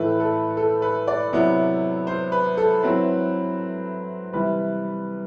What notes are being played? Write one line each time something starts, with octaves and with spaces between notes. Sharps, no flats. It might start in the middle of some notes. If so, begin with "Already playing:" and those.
Already playing: A2 E3 A3 E4 B4
A4
A4
B4
D5
C3 F#3 B3 E4
C5
B4
A4
F#3 C4 E4 B4
C3 E3 G3 B4